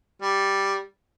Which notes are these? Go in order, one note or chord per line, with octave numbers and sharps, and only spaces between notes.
G3